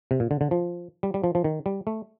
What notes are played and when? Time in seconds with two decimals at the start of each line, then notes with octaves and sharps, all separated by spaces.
0.11 C3
0.20 A#2
0.31 D3
0.41 D3
0.51 F3
1.03 G3
1.14 G3
1.24 F3
1.35 F3
1.44 D#3
1.66 G3
1.87 A3